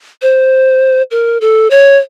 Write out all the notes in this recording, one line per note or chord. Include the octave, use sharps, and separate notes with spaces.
C5
A#4
A4
C#5